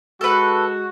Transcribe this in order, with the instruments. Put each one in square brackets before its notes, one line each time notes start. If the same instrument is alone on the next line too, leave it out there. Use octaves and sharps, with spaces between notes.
[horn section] G#3 F#4 [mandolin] A4 B4